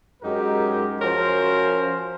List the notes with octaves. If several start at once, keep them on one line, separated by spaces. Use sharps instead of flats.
F#2 F#3 G#3 D#4 G4 A#4
F3 C#4 F#4 A#4 C5